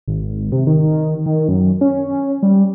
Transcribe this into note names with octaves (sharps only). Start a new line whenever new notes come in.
G#1
C3
D#3
D#3
F#2
C#4
G3